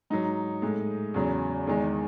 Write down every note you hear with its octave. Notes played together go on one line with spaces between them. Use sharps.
G#2 F#3 D#4
A2 G#3
E2 C#3 F#3
E2 D#3 G#3